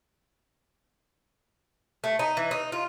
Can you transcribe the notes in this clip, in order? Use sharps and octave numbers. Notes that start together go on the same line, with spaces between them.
A3
D#4
E3
D#4
F4